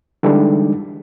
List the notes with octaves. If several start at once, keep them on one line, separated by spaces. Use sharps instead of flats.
D3 E3 G3 G#3 D4 D#4